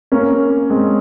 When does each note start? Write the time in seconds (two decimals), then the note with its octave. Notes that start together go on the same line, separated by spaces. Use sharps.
0.12 A#3 C#4
0.70 G#3 C4